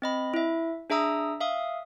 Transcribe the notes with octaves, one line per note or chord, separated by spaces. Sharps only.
C4 D#5 B5
E4 E5
D4 G#4 E5 A#5 D#6 E6
E5 F5 D#6